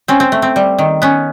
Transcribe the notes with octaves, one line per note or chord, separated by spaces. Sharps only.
C4 C#4
C4
A3
C4
G3
D#3
B3 C#4